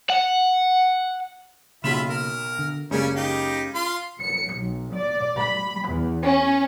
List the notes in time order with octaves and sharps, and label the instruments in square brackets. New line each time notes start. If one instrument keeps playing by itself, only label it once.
[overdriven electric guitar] F#5
[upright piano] B1 E7 [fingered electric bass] C#3 A#3 C#4 [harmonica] F4 E5 B5
[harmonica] A#4
[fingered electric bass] D3
[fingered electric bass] F#1 G#3 [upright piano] C#3 A#3 [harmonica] G3 C#4
[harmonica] D#4 G4
F4 C6
[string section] C#7
B1
D5
B5
E2
C#4